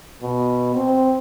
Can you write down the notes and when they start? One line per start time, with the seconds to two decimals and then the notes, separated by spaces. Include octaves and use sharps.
0.22 B2
0.75 C4